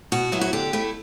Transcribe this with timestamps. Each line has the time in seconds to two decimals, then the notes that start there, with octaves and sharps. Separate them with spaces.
0.12 B2 F#4
0.32 F#3 B3 E4
0.41 F#4
0.53 D3 G4
0.73 A3 E4